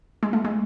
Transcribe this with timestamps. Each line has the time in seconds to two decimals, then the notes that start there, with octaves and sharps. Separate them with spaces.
0.23 G#3
0.33 A3
0.45 G#3